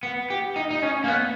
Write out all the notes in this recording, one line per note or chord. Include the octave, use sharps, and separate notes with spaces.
B3
G4
D#4
D#4
C#4
A#3
B3